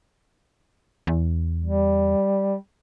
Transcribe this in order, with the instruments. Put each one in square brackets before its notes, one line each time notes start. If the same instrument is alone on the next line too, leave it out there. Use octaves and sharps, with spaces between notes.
[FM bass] E2
[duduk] G3